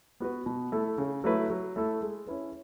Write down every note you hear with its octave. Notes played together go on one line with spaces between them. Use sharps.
B3 F#4 B4
B2
A3 E4 A4
C#3
F#3 A3 E4 B4
F#3
A3 E4 A4
G#3
C#4 E4 B4